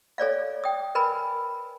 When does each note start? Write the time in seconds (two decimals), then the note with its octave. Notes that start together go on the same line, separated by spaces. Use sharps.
0.18 A4 C#5 D5 F5
0.64 G5 D#6
0.95 A#4 B4 G#5 B5